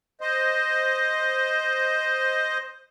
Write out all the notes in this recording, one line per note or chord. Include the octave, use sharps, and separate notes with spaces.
C5 D#5